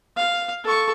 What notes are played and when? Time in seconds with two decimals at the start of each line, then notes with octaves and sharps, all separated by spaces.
0.17 F5
0.64 A4 C#6